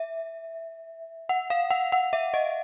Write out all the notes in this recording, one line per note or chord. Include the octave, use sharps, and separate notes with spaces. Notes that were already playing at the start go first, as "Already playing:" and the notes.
Already playing: E5
F#5
F5
F#5
F#5
E5
D#5